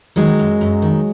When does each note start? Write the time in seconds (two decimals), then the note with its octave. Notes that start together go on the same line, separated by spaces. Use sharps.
0.16 D#3 F#3 G#3
0.39 F#2
0.61 F#2
0.82 D#3